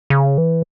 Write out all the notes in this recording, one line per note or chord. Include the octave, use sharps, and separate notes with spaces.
C#3
E3